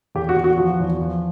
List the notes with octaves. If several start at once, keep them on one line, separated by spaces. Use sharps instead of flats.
E2 G4
F#4
E2
F#4
F3 F#4
E2
F3